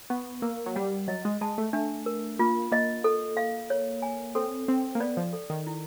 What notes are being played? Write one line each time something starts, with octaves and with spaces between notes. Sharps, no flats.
B3 C#6
A#3 A#4
F#3
G3 F#5
F#3 D#5
G#3
G#3 A5
A3
A3 D4
A#4
A#3 F4
A#3 D#5
A4
F5
C#5
G#5
C4 A4
C4 G5
A#3
B3 D5
F3
A4
D#3
E4